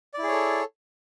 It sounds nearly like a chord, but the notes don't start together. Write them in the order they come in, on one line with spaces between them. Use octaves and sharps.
D5 E4 G#4 C#5 A4